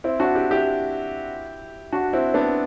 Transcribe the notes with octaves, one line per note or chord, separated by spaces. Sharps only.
C4 E4
D4 F#4
E4 G4
E4 G4
D4 F#4
C4 E4
B3 D4